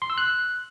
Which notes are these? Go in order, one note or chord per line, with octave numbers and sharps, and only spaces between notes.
C6
E6
F#6